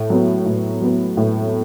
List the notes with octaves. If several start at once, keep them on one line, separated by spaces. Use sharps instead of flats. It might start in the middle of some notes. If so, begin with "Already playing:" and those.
Already playing: A2
F#3 B3
A2
F#3 B3
A2